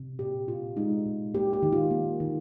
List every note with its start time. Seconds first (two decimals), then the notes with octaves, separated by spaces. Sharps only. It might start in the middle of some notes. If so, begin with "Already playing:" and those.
Already playing: C3
0.19 A#2 G4
0.48 A#2 F4
0.77 G#3 D#4
1.06 A#2
1.34 A#3 G4
1.53 G4
1.63 D#3
1.73 F4
1.91 A#3
2.20 D#3